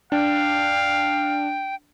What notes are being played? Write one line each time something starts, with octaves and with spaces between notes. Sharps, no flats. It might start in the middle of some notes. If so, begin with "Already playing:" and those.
D4 F5 G5